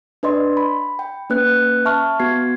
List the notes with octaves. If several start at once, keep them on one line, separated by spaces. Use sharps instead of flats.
D4 B4 D5 D#5 C6
B5
G5
A#3 C#4 B4 F#6
E5 A5 C#6 F6
B3 F#4 G#6 C7